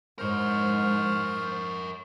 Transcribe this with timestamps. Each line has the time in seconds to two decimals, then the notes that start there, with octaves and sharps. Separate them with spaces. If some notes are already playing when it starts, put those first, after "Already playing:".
0.18 G#2 A#4 C5 C#5 F6